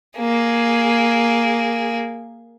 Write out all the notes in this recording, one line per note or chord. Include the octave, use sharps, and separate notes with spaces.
A#3 G#4